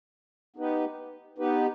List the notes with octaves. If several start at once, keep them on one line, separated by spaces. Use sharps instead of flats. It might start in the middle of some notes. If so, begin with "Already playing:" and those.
B3 D#4 G4 B4
B3 D#4 G4 B4